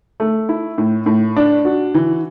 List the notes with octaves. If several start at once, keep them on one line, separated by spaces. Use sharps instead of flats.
A3
E4
A2
A2
D4
F#4
E3